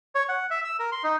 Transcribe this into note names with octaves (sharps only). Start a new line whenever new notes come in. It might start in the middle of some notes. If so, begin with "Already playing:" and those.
C#5
F#5
E5
E6
A#4
C6
D#4